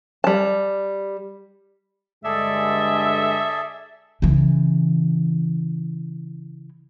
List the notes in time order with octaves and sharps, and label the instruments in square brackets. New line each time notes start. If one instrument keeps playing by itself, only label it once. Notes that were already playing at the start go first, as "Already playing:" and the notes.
[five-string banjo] G3 A5
[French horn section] G2 D3 G#3 [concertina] G#4 A4 D5 [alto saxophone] E5
[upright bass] C#3 E3